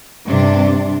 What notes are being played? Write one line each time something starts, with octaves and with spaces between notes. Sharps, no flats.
G2 C3 D4